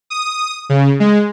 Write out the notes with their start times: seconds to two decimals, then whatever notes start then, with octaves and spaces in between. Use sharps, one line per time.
0.10 D#6
0.69 C#3
1.00 G#3